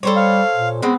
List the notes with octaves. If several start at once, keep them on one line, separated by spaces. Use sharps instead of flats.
G3 A4 C5 C#5
F5
A#2
G#3 B3 C4